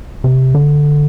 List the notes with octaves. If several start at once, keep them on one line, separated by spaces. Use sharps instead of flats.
C3
D3